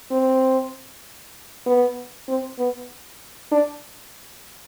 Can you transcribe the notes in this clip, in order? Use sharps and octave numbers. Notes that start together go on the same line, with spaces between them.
C4
B3
C4
B3
D4